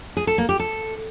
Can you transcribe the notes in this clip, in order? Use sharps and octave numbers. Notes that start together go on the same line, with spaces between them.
G#4
A4
A#3
G4
A4